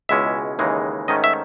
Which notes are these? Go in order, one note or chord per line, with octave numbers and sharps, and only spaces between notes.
C#2 B2 G#3 C#4 E4 E5
D#2 C#3 E3 G#3 D#4
G#2 D#3 A3 C#4 D#5
E5